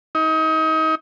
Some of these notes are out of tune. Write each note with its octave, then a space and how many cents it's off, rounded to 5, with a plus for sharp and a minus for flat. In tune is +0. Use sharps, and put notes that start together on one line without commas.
D#4 +30